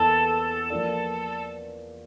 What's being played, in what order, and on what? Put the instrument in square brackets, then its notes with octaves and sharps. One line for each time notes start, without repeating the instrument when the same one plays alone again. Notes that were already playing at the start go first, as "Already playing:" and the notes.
Already playing: [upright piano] E2 A#3 [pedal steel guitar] A4
[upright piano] F3 A#3 F4 A#4 D5